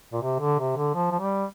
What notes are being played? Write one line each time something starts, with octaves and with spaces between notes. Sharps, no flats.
A#2
C3
D3
C3
D3
F3
F3
G3